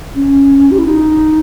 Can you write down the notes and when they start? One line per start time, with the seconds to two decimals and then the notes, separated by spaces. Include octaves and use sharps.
0.15 C#4
0.71 G4
0.78 E4
0.86 D#4